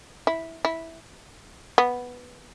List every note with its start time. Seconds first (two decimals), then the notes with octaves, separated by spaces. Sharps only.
0.27 E4
0.65 E4
1.78 B3